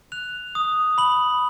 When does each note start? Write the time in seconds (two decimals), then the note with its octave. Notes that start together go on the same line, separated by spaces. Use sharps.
0.12 F#6 F7
0.55 D#6
0.98 B5 F#7